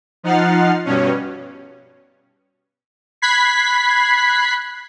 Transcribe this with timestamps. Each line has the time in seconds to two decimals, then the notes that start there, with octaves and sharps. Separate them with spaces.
0.23 F3 D#4 F#5 F6 A6 C7
0.85 G2 B2 C#4
3.22 B5 F#6 G#6 B6 C7